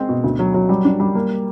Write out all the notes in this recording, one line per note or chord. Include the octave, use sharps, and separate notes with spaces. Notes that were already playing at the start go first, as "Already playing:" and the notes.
Already playing: G#3 C4
B2
D2
F#3
F#3
G3
D4
G3
A#3